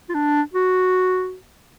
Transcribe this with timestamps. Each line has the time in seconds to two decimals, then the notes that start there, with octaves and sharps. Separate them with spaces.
0.09 F4
0.14 D4
0.53 F#4